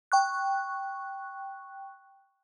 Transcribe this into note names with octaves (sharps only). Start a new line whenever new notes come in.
G5 C#6 F#6